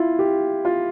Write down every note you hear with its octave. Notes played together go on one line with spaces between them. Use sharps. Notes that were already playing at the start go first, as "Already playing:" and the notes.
Already playing: E4 F4
G4
F4